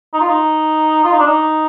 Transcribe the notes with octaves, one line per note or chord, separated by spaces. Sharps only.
D#4
F4
D#4
F4
D#4
D4
D#4